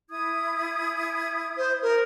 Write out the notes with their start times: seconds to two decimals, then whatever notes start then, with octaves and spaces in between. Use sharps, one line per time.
0.10 E4 D#6 G#6
1.57 C5
1.82 A#4